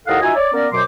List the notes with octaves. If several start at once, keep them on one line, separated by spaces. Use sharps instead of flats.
D#2 E4 A4 D#5 F5 F#5
D#4 F4 F#4 E5 G#5
C#5 D5
A#3 B3 C#4 A#4 D5
F#2 B2 F#3 C5 C6 D6